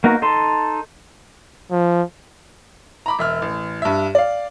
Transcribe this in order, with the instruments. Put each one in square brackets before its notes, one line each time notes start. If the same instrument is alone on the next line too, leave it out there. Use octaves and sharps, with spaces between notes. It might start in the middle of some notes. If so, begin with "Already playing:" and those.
[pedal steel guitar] A#3 B3 D#4 F#4 A#4
D#4 A4 A5 C6
[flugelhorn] F3
[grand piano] A#5 B5 D6
E1 E5 F6
A1
G2 E5
D5 F5